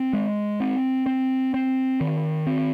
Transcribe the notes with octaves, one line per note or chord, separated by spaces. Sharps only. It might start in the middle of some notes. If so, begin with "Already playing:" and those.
Already playing: C4
G#3
C4
C4
C4
D#3
C4